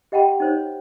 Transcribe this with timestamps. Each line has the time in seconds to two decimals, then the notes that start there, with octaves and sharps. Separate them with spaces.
0.12 G4 D#5 F#5 G5 A5 B5
0.40 D#4 C5 C#5